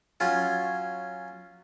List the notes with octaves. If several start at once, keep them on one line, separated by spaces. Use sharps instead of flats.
F#3 C#4 F4